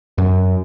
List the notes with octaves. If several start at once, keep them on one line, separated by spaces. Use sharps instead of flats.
F#2